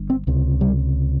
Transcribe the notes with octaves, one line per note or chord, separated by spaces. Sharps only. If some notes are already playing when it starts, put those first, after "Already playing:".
Already playing: G1 G2
C4
C#2 C3
G3